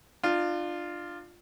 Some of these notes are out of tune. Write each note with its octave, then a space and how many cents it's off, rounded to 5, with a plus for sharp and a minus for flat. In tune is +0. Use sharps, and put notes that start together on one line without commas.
D4 +35 F4 +0